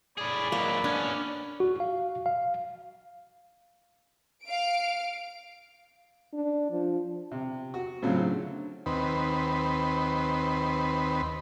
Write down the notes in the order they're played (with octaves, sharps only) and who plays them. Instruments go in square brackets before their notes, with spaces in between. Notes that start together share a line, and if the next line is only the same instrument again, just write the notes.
[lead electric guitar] A2 G#4 [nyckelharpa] D5 B5
[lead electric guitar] G#2 F#3 [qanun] A#3
[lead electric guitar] B3 C#4 [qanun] D4
[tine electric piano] F#4
F5
F5
[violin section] F5 D7
[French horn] D4
F3
[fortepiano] C3
F#4
A2 C#3 F#3 C4 F4
D3
[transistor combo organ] D#2 C4 B4